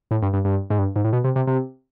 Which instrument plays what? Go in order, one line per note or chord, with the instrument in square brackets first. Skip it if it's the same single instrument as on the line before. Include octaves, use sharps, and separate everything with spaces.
[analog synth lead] A2
G2
G2
G2
G#2
G2
G#2
A2
B2
C3
C3
C3